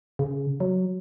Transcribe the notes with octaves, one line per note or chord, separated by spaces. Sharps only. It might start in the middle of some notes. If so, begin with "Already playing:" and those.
C#3
F#3